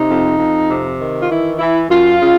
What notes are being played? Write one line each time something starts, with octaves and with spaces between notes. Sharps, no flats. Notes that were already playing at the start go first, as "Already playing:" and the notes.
Already playing: C3 D#4
F2
F2
C3
D#3
F4
E3 E4
E3 E4
F#2 F4
C#3